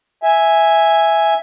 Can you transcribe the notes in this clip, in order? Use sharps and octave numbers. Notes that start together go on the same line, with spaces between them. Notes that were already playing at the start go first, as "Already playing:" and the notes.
E5 G#5